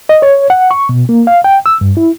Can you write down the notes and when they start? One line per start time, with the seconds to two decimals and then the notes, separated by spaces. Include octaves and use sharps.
0.09 D#5
0.22 C#5
0.50 F#5
0.71 C#6
0.89 B2
1.09 A#3
1.27 F5
1.44 G5
1.66 E6
1.81 G2
1.97 E4